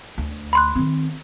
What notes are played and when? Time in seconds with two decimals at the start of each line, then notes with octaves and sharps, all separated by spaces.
0.18 D2
0.53 B5 C6 F#6
0.75 D#3 C4